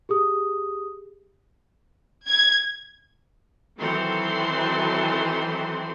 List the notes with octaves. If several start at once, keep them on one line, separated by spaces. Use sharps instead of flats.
G4 G#4 D#6
G#6
D#3 E3 F#3 C4 A4 C6